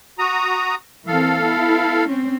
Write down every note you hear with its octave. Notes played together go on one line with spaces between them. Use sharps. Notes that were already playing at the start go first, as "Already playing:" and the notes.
F#4 A#5 D#6
E3 A#3 C4 A4 F5
B3 E4
C4 C#4